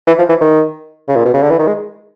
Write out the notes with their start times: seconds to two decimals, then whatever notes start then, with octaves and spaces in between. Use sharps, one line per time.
0.07 E3
0.19 F3
0.29 E3
0.41 D#3
1.08 C#3
1.16 A#2
1.25 B2
1.34 C#3
1.42 D3
1.50 E3
1.59 D#3
1.67 G#3